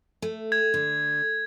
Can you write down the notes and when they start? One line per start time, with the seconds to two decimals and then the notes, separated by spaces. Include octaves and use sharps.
0.22 A3
0.52 G#6
0.74 D3